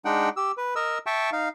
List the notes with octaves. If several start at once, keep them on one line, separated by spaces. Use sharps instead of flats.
G#3 D4 D#4 F#5 G5
G4 E6
B4
A#4 D#5 E6
E5 G5 A5 C#6
D#4 F5